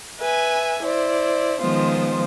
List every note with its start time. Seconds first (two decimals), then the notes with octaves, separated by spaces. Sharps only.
0.19 B4 E5 G#5
0.82 E4 C5 D5
1.60 D#3 F3 G#3 B3 F4 C5